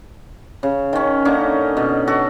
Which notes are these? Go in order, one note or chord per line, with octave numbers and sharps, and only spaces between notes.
C#3
D#3 C#4
D3 A#3 C#4 D#4
B2
F#4 A4